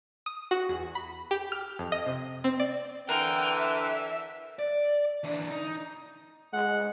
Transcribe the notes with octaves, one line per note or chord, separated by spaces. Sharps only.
D#6
F#4
E2
B5
G4
F6
F2
D#5
C3
C4
D5
D3 E3 A#4 G5
E5
D5
E3 D4
D#4
G#3 F#5